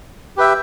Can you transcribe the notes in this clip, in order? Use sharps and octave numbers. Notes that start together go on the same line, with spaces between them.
G4 B4 E5 G5